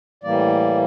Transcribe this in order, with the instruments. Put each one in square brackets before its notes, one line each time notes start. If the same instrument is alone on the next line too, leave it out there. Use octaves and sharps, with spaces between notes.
[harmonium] A2 E3 G3 A#3 D5